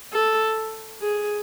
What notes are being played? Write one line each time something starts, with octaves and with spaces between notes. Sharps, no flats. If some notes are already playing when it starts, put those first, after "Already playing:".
A4
G#4